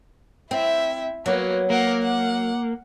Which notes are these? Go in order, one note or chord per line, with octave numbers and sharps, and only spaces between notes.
C4 E4 E5
F#3 A#3 B3
A#3 A#4 F#5
F#5